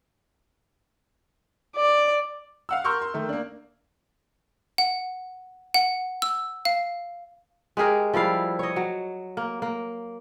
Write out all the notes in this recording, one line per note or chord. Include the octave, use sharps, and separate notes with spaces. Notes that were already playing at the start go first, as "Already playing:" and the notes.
D5
F5 F#5 E6
A#4 C6 C#6 E6 F6 G6
C6
D#3 A3
A#3 D4
F#5
F#5
E6
F5
G#3 G4 G#4 A#4
F3 G3 E4 F5
C#5 D#5
F#3
A#3
A#3